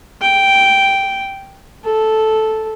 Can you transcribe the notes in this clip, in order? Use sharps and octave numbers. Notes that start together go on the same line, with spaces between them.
G5
A4